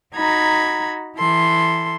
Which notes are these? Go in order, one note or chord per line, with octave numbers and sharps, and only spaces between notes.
D#4 F#4 A#5 B5 G#6
E3 A4 C6